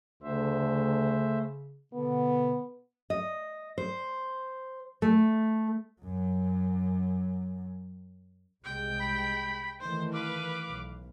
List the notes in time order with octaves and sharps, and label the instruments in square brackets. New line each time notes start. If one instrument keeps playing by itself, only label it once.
[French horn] D2 [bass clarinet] C#3 [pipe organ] A3 C5 E5
[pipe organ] B2 [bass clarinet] D3 [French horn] B3
[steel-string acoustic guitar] D#5
C5
A3
[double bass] F#2 F#3
[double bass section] C2 C3 G#3 [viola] G5
[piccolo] B5
[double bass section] D#3 E3 A3 [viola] C5
[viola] B4 F5 [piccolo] D6
[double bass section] B1